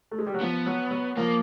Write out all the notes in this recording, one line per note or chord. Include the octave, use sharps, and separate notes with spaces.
A3
G#3
G3
F#3
F3 B3
F#3
F#3
F3 A#3